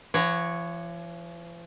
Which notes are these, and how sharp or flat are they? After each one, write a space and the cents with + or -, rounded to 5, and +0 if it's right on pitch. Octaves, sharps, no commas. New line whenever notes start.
F3 -45 C#5 +0 F#5 +0